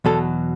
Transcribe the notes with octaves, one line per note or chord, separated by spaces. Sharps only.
E2 B2 F#3 A4